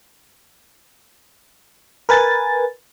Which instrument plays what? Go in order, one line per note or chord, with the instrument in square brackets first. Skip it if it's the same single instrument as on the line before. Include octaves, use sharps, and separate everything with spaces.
[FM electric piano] A#4 B4 G#5 A6